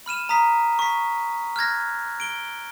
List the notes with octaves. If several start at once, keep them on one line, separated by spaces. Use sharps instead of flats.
B5 F6 D#7 E7
A#5 D#6 B6
C#6 B6
F6 F#6 G#6 A#6
D7 G7